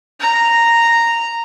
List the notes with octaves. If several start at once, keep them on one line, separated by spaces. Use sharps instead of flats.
A#5